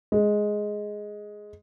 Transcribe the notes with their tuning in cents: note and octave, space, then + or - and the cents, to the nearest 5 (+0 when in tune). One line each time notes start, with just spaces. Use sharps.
G#3 +5